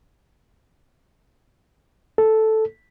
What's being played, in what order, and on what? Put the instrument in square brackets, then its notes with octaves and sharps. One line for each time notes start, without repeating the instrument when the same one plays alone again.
[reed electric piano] A4